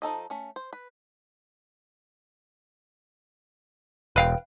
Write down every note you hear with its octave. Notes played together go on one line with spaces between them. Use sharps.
F3 D#4 A4 D#5
A3 C#4
C5
B4
E1 B4 F5 G5